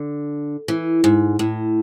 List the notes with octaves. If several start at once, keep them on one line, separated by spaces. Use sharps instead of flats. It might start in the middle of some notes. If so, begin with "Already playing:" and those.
Already playing: D3
E3
G#2
A2